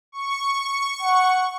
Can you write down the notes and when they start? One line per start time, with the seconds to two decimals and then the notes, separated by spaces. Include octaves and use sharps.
0.12 C#6
1.02 F#5